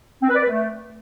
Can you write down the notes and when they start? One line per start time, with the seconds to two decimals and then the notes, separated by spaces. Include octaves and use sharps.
0.22 C4
0.29 B4
0.36 D5
0.42 B4
0.49 A3